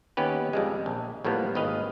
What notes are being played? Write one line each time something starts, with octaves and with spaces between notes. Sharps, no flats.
D#2 B3 C#4 G4 B4
F2 G3 G#3
A#1
A2 F3 G3 A#3 B3
G#1 D#2 B4 D#5 F5